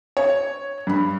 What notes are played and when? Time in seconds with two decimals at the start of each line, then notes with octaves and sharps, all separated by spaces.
0.17 C#5
0.87 G2 B5